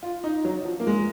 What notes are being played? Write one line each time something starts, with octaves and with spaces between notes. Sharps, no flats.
F4
D#4
F#3
F3
A#3
G#3